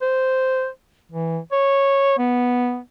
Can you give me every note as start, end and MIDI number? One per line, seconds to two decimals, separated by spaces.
0.02 0.68 72
1.12 1.38 52
1.52 2.13 73
2.18 2.79 59